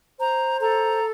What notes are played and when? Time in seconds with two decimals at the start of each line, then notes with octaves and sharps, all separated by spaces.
0.19 C5 A#5
0.60 A4 A#5